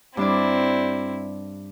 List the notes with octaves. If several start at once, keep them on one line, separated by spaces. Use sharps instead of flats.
G2 C4 D4 E4 D5